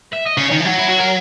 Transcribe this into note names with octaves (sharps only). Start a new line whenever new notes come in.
E5
D#5
C#3 C#5
D#3
E3
F#3
E4
F#4
A#4